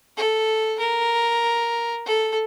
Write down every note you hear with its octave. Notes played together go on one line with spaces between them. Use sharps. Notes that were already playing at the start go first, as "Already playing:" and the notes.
A4
A#4
A4